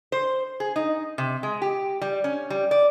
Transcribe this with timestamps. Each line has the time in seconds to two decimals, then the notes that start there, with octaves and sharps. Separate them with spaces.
0.12 C5
0.60 G#4
0.76 D#4
1.18 C3
1.43 G#3
1.62 G4
2.01 G3
2.24 C#4
2.50 G3
2.71 D5